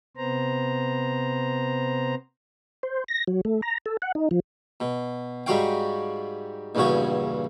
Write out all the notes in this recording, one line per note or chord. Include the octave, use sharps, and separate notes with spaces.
C3 B3 C5 A#5
C5
A#6
F#3
A3
A#5
A4
F#5
D#4
F3
B2
G#2 G3 F#4 C#5 F5 G5
A#1 E2 G2 C#3 F#4 C#5